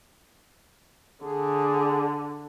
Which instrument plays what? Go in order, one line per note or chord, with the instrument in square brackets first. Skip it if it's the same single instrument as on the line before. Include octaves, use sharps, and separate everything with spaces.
[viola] D3 [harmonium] G#4